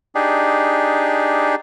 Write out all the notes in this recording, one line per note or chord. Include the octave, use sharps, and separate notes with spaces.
D4 D#4 G4 G#4